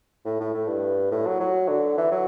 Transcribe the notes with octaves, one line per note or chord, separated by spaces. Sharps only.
A2
A2
A2
G2
A2
F#3
F#3
D3
E3
F#3